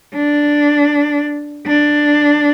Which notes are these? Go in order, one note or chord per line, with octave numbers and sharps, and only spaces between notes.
D4
D4